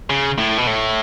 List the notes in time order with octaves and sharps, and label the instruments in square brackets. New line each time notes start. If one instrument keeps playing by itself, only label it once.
[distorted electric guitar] C#3
A2
B2
A2